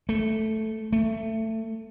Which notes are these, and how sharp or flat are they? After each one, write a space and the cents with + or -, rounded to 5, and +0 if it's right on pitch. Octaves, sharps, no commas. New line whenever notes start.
A3 -5
A3 +20